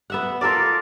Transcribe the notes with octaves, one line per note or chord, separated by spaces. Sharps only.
B3 E5 F#5
F4 A4 A#4 D5